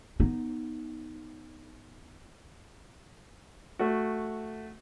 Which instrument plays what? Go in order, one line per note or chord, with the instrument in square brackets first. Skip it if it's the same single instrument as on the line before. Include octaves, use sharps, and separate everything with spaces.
[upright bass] B3 D#4
[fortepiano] A3 F#4